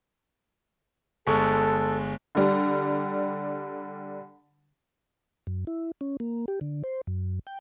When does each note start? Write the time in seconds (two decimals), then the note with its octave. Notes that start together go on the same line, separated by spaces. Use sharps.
1.27 G1 G#3 A4 C#6
2.35 D3 G3
5.47 F#2
5.67 E4
6.01 C#4
6.20 A#3
6.48 G4
6.61 D3
6.84 C5
7.07 F#2
7.47 G5